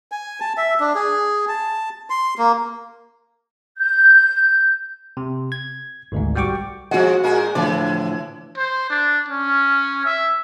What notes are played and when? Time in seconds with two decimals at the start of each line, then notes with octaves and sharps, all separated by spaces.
0.12 G#5
0.40 A5
0.57 E5
0.80 D4
0.95 G#4
1.48 A5
2.10 C6
2.38 A#3
3.78 G6
5.17 C3
5.52 G#6
6.12 G#1 D2 G#2
6.35 B1 G3 F#4 G5 C#6 D6
6.91 F3 G#3 F#4 F#5
7.23 A#2 G#3 A#4
7.55 A2 D3 E3 F3 D5
8.57 C5
8.90 D4
9.29 C#4
10.05 E5